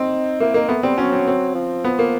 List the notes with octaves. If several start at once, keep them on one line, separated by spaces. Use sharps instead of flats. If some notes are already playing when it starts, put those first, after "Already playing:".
Already playing: C4 D#4
A#3 E4
A#3 D#4
A3 B3
G3 C4
F#3 C#4
C4
C4
F3
B3
A#3